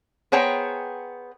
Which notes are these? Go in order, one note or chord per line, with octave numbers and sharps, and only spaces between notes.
B3 G#4 C5 C#5 G5 A#5